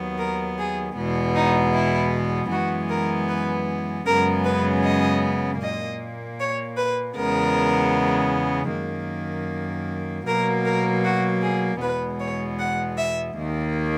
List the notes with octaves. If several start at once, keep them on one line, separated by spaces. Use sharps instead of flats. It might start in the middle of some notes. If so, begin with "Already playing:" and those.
Already playing: D#2 D#3 F#3 B3
A#4
G#4
E2 B2 G#3 B3
D#4
E4
F#2 E3 G#3 B3 F#4
A#4
B4
F#2 C#3 G#3 B3 A#4
B4
D#5
A#2 A#3 D#5
C#5
B4
E2 C#3 G#3 B3 A#4
F#2 D#3 A#3
B2 F#3 A#3 A#4
A#4
F#4
G#4
E2 B2 G#3 B3 B4
C#5
F#5
E5
D#2 D#3 A#3